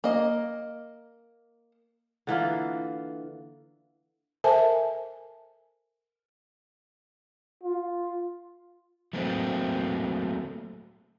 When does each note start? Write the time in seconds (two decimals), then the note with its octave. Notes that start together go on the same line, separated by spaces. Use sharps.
0.04 A#3 D#5
2.27 D3 E3 A#3 F4
4.44 A4 A#4 C5 E5 G#5 A5
7.63 F4
9.13 F#3 A3 A#3 C4